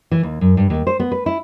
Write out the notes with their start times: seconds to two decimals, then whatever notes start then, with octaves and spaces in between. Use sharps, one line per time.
0.11 E3
0.23 D#2
0.41 F#2
0.57 G2
0.70 D#2
0.87 C5
1.00 B3
1.12 B4
1.26 E4